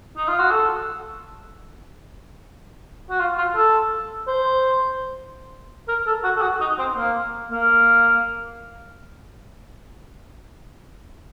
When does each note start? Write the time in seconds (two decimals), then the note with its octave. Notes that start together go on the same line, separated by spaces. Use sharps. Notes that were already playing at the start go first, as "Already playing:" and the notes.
0.17 D#4
0.28 F4
0.39 F#4
0.51 A4
3.10 F#4
3.20 F4
3.38 F4
3.56 A4
4.28 C5
5.89 A#4
6.07 A4
6.24 F#4
6.37 A4
6.42 F#4
6.61 D#4
6.79 C4
6.97 A#3
7.50 A#3